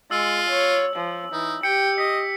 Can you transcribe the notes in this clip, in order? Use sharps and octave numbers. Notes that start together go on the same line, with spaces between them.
G#3 F4 E6
C#5
F3
E3 D#4
G4 G5 C#7
D#5 B6